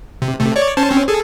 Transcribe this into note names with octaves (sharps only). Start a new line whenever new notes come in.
C3
C3 A3
C#5 D5
C#4 C5 A5
C4 C#4
G#4 A4